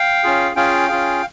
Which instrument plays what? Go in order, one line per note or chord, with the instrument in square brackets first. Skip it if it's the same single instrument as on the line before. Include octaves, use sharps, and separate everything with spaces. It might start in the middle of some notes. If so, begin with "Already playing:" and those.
Already playing: [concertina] F5 G5
C#4 F4 G#4
C#4 F4 G#4 F5 G5
C#4 F4 G#4